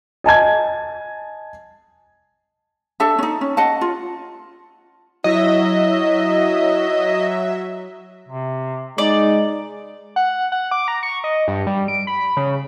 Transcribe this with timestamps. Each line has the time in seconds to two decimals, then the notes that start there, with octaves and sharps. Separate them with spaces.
0.24 D#5 G#5 A5 G#6
3.00 D4 A4 E5 A5
3.19 C#4 D#4
3.41 C#4
3.57 D#5 F#5 A5
3.81 F4
5.24 F#3 E4 D#5 E5
8.29 C3
8.98 G#3 D#4 D5
10.16 F#5
10.52 F#5
10.71 D6
10.88 A#5
11.03 C#6
11.24 D#5
11.48 G2
11.67 G3
11.88 D7
12.07 B5
12.37 C#3